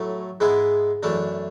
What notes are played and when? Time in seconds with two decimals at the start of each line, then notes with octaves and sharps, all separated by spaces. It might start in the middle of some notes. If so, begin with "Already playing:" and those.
Already playing: A2 F#3 A3
0.40 G#2 G#3 B3 E4 G#4
1.03 F#2 E3 A3 D4